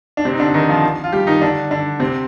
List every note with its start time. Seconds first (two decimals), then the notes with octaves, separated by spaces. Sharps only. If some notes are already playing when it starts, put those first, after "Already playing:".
0.17 D4
0.25 C3 C4
0.33 D#4
0.40 D3 D4
0.54 D#3 D#4
0.69 F3 F4
1.04 F4
1.12 G3 G4
1.27 D#3 D#4
1.41 D3 D4
1.71 D3 D4
2.00 C3 C4